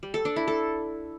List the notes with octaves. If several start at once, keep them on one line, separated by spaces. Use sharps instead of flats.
G3
A4
D4
E4
A4